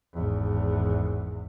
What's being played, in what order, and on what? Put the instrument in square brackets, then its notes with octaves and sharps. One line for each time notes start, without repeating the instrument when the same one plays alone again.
[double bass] G#1 E2